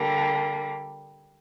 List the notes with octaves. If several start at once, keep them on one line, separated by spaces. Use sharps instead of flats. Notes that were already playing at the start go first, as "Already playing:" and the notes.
Already playing: D3 G3 A#3